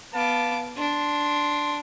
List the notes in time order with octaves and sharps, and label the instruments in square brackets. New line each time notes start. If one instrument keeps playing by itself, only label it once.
[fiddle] B3 D6 [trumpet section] F5 A5
[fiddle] D4 [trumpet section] C6